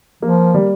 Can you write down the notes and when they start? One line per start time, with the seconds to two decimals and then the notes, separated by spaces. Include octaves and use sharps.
0.22 F3 A#3
0.54 G3